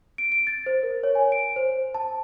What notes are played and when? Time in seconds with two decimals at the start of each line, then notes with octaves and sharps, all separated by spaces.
0.18 D7
0.32 D7
0.47 A6
0.66 C5
0.83 A#4
1.03 C#5
1.15 G#5
1.32 D7
1.56 C5
1.94 A5